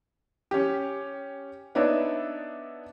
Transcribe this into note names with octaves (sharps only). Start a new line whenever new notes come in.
C#4 G4
B3 D4 D#4 C#5 D5 E5